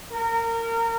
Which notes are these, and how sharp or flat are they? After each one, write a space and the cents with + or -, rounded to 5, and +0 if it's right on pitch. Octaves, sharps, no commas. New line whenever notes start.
A#4 -25